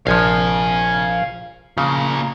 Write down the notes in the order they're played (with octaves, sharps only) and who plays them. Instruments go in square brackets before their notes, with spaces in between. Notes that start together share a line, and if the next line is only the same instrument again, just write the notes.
[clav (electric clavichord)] A#1 F3 [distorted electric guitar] F5 G#5
[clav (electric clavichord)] C#3 [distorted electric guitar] F3 A#3